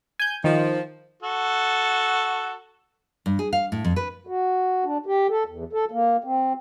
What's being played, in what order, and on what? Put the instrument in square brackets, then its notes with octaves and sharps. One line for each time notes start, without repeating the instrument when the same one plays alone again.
[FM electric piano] G#5 G6
[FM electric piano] D#3 [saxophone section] F3
[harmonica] F#4 A4
[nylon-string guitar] G2
G#4
F5
A2
F2
B4
[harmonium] F#4
D4
G4
A4
E2
A4
A#3
C4